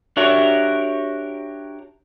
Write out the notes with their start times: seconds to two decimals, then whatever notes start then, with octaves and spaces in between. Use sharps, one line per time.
0.17 D4 F#4 G4 A#4 C#5 E5